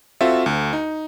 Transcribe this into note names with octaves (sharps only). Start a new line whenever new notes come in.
C4 F4 F#4 A4 E5
D2
D#4